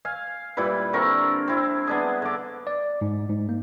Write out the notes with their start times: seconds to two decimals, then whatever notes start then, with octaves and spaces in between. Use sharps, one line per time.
0.05 F5 G#5
0.57 A#2 G3 E4 B4
0.93 D3 C4 A#4 C#6
1.48 C4 E4
1.87 B3 D4 G#4
2.22 D3 D6
2.67 D5
3.01 G#2
3.29 G#2
3.49 A#3